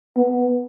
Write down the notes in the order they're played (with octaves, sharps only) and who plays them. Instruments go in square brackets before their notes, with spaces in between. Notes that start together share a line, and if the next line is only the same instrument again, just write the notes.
[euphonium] B3